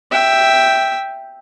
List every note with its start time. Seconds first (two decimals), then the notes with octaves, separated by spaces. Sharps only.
0.12 E5 G5